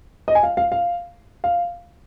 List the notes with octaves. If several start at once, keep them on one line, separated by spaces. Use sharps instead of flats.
D#5
G#5
F5
F5
F5
F5